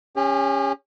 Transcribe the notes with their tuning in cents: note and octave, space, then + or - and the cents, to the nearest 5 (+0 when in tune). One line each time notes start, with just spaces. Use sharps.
C#4 +0 G4 +45